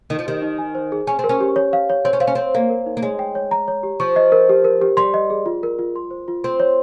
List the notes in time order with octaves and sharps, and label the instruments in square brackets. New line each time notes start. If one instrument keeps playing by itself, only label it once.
[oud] D#3 [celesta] D#4
[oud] F3
[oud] D#3 [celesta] G4
[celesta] D#4
G#5
C5
G#4
[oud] C#4 [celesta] G#5
[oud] C4
[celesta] A#4
[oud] C#4
[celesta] G4
C#5
F5
C#5
[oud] C4 [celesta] C#5
[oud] C#4
[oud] C4 [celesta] F5
[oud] C#4
[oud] C4 [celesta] C#5
[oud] A#3 [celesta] F5
[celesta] A#4
D#4
[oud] A#3
[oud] G#3 [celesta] C#5
[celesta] G5
C#5
A#5
C#5
G4
[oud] F3 [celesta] C#6
[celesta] D#5
A#4
G4
A#4
G4
[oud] G3 [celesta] C6
[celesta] D#5
G#4
F4
A#4
F4
C6
C5
F4
[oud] C4 [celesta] C6
[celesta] C#5